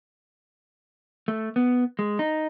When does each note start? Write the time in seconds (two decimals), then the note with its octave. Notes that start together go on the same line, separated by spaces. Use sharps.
1.28 A3
1.56 B3
1.99 G#3
2.19 D#4